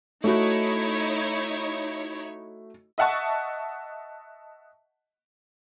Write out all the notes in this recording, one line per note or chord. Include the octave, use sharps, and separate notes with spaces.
A3 D#4 E4 F#4 C#5
D#5 E5 F#5 A5 C#6